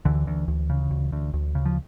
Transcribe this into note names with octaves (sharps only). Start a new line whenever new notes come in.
D2 D3 E3
D2
D2
C#3
D2
D2
D2
C#3
F3